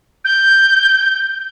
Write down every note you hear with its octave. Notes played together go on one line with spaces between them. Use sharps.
G6